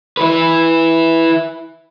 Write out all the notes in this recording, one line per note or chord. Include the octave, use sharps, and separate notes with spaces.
E4 B4